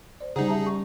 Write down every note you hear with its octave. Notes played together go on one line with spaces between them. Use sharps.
C5 D5
C#3 G3 D#4 G#4 C5 F#5 A#5
E5 A5 A#5
C#6